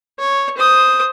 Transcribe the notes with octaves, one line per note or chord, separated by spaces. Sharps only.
C#5
C5 D#6